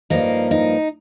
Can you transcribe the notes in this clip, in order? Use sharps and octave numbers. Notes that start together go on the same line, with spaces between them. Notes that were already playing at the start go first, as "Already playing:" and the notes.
G2 F3 A#3 D#4
D#4